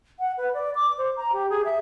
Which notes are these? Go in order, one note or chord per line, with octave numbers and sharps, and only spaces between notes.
F#5
B4
D5
D6
C5
A#5
G4
G#4
E5